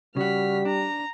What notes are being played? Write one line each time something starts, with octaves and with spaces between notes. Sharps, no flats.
C#3 G3 F#4 F6 B6
D4 A#5